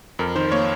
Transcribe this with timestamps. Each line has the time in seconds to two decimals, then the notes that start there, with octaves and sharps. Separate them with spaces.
0.19 F2 A#4
0.35 D#3 C5
0.52 A#3 C#5